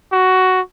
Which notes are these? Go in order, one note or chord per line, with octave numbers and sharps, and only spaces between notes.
F#4